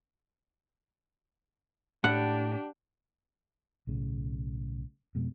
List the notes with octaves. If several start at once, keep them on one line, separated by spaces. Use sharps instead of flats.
A2 D4 G4 F#5
B1 A2 C#3
F2 B2 G#3